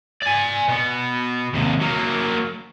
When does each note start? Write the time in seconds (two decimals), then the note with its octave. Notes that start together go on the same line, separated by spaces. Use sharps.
0.22 D5 G#5
0.68 B2 B3
1.54 D#2 C3
1.81 F#3 A#3